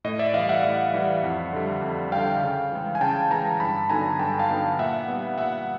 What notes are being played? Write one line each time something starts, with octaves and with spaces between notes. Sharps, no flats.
A2 D#5
D5 E5
E3 G3 D#5 F5
E5 F#5
A2
E3 G3
F2
D3 G3
F2
D3 G3 F5 G5
C#3
E3 G#3
G#5
C#3 G5 A5
E3 G#3 G#5 A#5
G2 A5 B5
D3 F#3 B3 D#4 G#5 A#5
G2 G5 A5
F5 G5
D3 F#3 B3 D#4
A#2 E5 F#5
G3 B3
A#2 E5 F#5